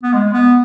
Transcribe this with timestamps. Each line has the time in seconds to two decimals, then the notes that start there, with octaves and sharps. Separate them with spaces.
0.03 B3
0.13 G#3
0.33 B3